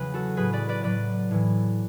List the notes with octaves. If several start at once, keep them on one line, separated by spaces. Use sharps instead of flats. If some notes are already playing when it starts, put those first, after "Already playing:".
Already playing: E2 C#3 F#3 B4
F#4 A4
A2 F#3 G#4 B4
B4 D5
B4 D5
A2 F#3 B4 D5
A2 E3